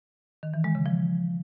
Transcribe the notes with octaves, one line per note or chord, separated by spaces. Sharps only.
D#3
E3
G#3
C#3
F3